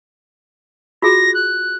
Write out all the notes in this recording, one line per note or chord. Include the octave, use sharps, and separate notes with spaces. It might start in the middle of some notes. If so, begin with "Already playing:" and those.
F4 F#4 G#4 A#6
F#6